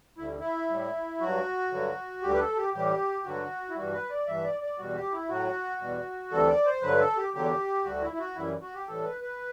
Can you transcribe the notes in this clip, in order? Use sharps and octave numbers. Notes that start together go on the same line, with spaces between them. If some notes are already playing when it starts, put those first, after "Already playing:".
D2 D3 G3 E4
E4
A2 G3
G2 F#3 F#4
G2 D3 F#3
D2 D3 G3 G4
B4
A4
G4
A2 E3 G3 G4
G2 D3 F#3 F#4
E4
G2 E3 G3 F#4
B4
D5
G2 E3 G3 E5
D5
D5
E2 B2 G3 F#4
G4
E4
A2 F#3 F#4
E2 B2 G3
D2 C3 E3 G3 A4
D5
C5
G2 D3 F#3 B4
A4
G4
E2 D3 F#3 G4
D2 D3 G3 F#4
E4
E4
F#4
F#2 E3 G3 E4
F#4
G4
A2 E3 G3 A4
B4
B4